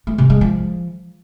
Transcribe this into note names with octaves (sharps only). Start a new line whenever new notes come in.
A3
C3
G#3
F3